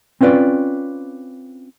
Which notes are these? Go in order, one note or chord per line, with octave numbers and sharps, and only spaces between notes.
C4 C#4 F4 B4 D5